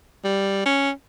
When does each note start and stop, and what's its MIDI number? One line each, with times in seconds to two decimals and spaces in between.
0.24 0.64 55
0.66 0.90 61